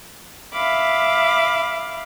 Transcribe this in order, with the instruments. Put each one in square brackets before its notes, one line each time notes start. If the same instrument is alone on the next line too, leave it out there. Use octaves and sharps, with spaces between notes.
[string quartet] E5 F5 B5 D6